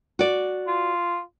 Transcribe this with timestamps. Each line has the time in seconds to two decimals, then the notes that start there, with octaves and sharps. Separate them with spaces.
0.19 F#4 D5
0.67 F4